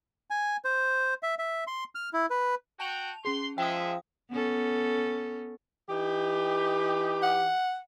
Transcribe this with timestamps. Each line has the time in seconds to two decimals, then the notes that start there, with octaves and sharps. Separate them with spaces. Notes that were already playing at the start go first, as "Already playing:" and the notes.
0.30 G#5
0.65 C5
1.23 E5
1.39 E5
1.67 C6
1.95 F6
2.13 E4
2.30 B4
2.80 F#4 G5 A5 F7
3.25 C#4 G#4 C6
3.58 F3 G#3 E5 F5 G5 D#6
4.30 B3 C#4 A4
5.88 E3 D#4 G4
7.22 F#5